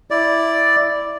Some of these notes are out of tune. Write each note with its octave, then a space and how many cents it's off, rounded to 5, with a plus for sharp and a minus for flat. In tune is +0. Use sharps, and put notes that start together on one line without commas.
E4 +0 D5 +0